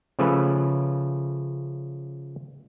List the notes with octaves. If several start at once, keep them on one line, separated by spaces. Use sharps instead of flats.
C#3 F3 A3 C#4 B4